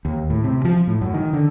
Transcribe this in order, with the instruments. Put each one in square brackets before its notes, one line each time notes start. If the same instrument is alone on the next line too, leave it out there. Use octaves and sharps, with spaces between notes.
[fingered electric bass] D#2
A2
C3
F3
A2
F#2
D#3
D3